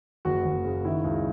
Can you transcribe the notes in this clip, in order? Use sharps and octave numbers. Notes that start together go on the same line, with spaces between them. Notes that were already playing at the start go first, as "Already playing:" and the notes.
F#1 F#4
F#1
C#3
D#3 E4
C#2